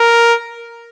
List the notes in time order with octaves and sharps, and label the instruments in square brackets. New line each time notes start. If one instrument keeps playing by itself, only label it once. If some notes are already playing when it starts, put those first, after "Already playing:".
Already playing: [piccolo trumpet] A#4